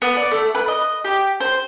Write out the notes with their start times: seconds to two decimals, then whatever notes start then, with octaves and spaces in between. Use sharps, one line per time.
0.02 B3
0.17 D5
0.31 A3
0.55 B4
0.68 D#5
1.04 G4
1.40 C5